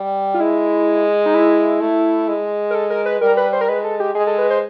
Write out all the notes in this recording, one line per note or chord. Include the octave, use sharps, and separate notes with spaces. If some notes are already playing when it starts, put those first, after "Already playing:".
Already playing: G3
F4
G#3 E4
D#4
E4
A3
G#3
A#4
A4
A#4
B4
G3 A#4
B4
C5
A#4
G#3 B4
A4
G4
G#3 G#4
A4
B4
C5